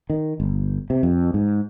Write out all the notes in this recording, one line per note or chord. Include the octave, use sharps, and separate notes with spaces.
D#3
G1
C3
F2
G#2